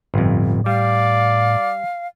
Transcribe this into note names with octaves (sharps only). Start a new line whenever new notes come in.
G1 F2 A2
G3 D5 F5